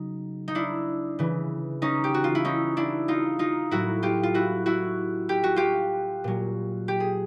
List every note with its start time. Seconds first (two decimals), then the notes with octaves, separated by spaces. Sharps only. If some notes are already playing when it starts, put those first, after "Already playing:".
Already playing: C#3 F#3 D#4
0.48 D#4
0.55 D4 E4
1.19 C#3 E3
1.82 C#4 D#4
2.04 G4
2.14 F#4
2.24 F4
2.35 E4
2.45 C#4 D#4
2.77 D4 E4
3.08 D#4 F4
3.39 D#4 F4
3.71 A2 F#3 E4 F#4
4.03 F4 G4
4.23 F4
4.34 E4 F#4
4.66 E4 F#4
5.29 G4
5.44 F#4
5.56 F4 G4
6.24 A#2 F#3
6.88 G4
7.00 G#4